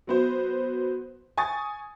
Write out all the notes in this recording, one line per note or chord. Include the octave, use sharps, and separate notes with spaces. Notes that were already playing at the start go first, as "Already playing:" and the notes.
F#3 B3 C5
G#5 C#6 D#6 A6